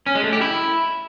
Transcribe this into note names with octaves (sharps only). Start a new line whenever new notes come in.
C#4
G#3
A3
G4
E4